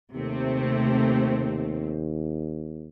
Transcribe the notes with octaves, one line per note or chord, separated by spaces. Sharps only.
D#2 C3 A3 C4